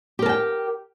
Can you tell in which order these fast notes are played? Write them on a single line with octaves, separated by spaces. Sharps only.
G4 A#4 A5 G5